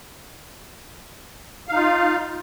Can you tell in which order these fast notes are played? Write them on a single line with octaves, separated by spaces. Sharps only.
F5 D#4 F4